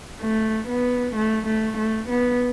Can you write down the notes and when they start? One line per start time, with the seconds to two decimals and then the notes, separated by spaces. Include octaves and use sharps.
0.23 A3
0.69 B3
1.16 A3
1.47 A3
1.78 A3
2.09 B3